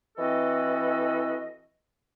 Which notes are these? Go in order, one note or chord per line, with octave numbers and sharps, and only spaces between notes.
E3 C4 E4 F#4 A4 D#5